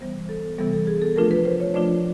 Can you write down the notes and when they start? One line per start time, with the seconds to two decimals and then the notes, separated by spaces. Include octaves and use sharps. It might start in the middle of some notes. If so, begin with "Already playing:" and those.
0.01 C3 E3 G3 B3 C5
0.29 A4
0.58 C3 E3 G3 B3 A4
0.73 A4
0.87 G#4
1.02 A4
1.16 F3 A3 D4 F4 A#4
1.31 B4
1.45 C5
1.60 C#5
1.74 F3 A3 D4 F4 D5